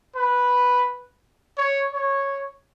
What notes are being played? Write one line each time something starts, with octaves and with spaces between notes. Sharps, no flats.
B4
C#5
C#5